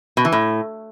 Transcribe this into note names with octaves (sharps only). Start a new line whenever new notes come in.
B2
E3
A2